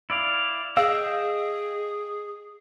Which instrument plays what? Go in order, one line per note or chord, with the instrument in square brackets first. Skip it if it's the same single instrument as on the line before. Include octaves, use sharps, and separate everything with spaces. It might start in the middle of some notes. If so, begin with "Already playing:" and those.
[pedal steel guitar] E4 D5 F5
[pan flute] G#4 [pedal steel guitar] D#5 G5 E6 [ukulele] F5